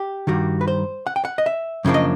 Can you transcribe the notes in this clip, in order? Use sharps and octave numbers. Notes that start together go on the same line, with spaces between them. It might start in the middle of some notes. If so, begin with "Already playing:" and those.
Already playing: G4
G2 D#3 G3 F#4
B4
C5
F#5
G5
F#5
D#5
E5
F#2 C#3 F3 A#3 D4
D#5